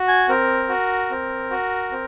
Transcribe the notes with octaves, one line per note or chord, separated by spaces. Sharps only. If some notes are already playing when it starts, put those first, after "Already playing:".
Already playing: F#4
G#5
C4 A#4
F#4
C4
F#4
C4